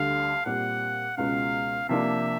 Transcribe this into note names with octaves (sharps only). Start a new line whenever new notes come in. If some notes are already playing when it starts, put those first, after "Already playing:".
Already playing: D2 D3 G3 F5
A#2 G3 C4 F#5
C#2 B2 G#3 C#4 F#4 F5
C3 F3 A#3 D4 E5